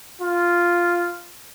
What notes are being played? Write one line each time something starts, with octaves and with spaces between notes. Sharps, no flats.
F4